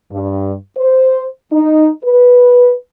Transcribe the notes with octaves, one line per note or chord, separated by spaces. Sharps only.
G2
C5
D#4
B4